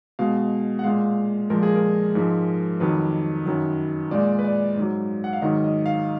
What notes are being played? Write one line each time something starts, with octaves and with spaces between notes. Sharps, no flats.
B2 G#3 F5
F#5
A#2 G#3 F5
A#2 F3 G#3 A#4
G#4
A#4
G#2 F3 G#3
F2 D#3 F#3 B4
F#2 D#3 F#3
A#2 G#3 D5
B4
D5
G#2 F#3
F#5
F5
G#2 D#3 F#3 D#5
D#5
F5